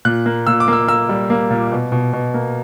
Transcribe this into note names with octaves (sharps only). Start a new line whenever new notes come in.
A#2 F#6
A#3
A#2 E6
D6
A#3 E6
A#3 E6
G3
A#3
A#2
B2
B2
B2
A#3